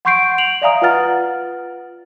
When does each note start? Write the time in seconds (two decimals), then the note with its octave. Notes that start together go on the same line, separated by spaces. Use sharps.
0.05 F#5 C6 C#6 G6 C7 D7
0.38 D7 F7 F#7
0.62 D5 E5 F5 G#5 A#5 D#6
0.82 F4 B4 F#5 F6 A6